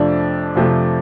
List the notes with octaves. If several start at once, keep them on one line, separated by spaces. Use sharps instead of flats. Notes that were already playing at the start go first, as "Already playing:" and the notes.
Already playing: F2 C3 F3 A3 D4
F2 C3 F3 A3